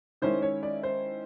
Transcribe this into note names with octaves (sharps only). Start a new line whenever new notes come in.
D#3 G#3 C#4 E4 C5
C#5
D5
C5